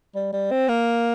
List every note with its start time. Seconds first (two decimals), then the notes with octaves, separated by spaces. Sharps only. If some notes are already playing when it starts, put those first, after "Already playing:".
0.15 G3
0.33 G3
0.51 C4
0.69 A#3